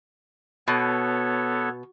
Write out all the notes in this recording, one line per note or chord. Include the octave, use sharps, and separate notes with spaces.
B2 B3 A4 C#5